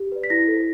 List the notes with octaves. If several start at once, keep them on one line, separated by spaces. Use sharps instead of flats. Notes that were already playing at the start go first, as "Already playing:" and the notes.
Already playing: G4
B4 D5
B6
E4 A#6
A4 C5